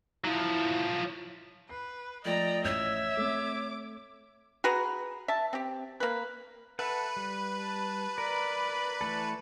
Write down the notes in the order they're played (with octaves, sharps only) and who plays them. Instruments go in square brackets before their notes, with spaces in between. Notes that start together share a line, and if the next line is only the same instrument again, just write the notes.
[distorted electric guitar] F3 F#3 [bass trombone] E4
[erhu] B4 [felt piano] C7
[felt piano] F3 A3 [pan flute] D5 [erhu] D#5 [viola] G5 A#5
[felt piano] A1 G6 [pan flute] C#5 [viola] E5
[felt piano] A3 C4 [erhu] D6
[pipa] F#4 G#4 B4 A#5
E5 A5
C4 G4
A#3 B4
[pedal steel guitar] A4 E5 F#5 [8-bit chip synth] B4
[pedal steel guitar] G3
[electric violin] A5
[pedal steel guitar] A#4 [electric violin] D5 B5
[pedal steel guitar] E3 A3 A4